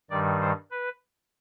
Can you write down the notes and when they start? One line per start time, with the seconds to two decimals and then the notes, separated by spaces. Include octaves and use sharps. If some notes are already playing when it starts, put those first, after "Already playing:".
0.10 G2 D#3 G3 D5
0.41 C5
0.71 B4